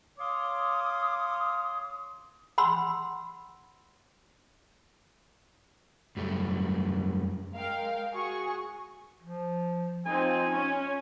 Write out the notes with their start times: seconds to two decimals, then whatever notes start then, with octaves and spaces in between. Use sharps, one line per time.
0.19 C#5 F5 C6 D6 D#6
2.58 F#5 B5 C6 E6
6.17 F#2 G3 A3
7.53 G#3 A#4 F5 G5
8.13 F#4 G#4 C#6
9.23 F3
10.06 F3 C4 D#4 G#5
10.51 C#4